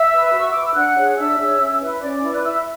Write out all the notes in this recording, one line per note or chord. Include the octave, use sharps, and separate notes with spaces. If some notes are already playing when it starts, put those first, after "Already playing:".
Already playing: E5 E6
B4
F#4
C#6
B4 D6
E6
D4 F#5 F#6
G#4 C#5
D4 E5 E6
G#4 C#5
C#4
E4 B4
C#4 D5 D6
E4 B4
F#6
E4 E5 E6